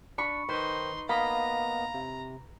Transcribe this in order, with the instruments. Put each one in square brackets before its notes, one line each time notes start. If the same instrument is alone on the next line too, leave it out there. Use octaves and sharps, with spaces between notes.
[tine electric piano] D4 [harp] B5 C#6
[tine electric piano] D#3 C5 [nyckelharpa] D#4 C6 [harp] B4
[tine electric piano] A#3 B3 D#5 [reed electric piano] F5 [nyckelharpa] A#5 [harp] B5
[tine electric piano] C3